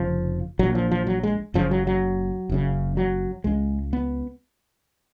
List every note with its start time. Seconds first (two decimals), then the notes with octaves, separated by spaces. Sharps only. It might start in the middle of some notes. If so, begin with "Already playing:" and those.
Already playing: F1 F2 C#3 F3
0.59 A#1 A#2 F#3
0.75 F3
0.91 F3
1.07 F#3
1.23 G#3
1.54 F#1 F#2 C#3 F3
1.71 F#3
1.87 F#3
2.49 F#1 F#2 C#3
2.97 F#3
3.44 C#2 C#3 G#3
3.93 B3